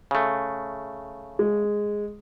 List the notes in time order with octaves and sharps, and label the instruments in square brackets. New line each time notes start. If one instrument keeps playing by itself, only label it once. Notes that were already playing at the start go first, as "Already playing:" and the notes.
[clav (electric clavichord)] C#3 A3
[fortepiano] G#3